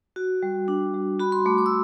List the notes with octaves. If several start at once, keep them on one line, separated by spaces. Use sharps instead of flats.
F#4
G3
D4
G3
F#4 B5
C6
A3 D6
D6
E6